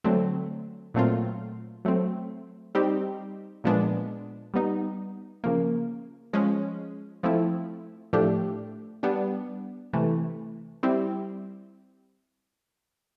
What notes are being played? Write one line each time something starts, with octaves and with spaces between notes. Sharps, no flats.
D3 F#3 A3 C4
A#2 F#3 A3 C4 F4
F#3 A3 C4
G3 C4 D#4 G4
A#2 F3 G#3 B3 D4
G3 B3 D#4
C#3 F3 A#3
F3 G#3 C#4
F3 A3 C4 E4
A2 F3 A3 D4 G4
G3 B3 D4
C3 E3 A3
G3 C4 E4 G4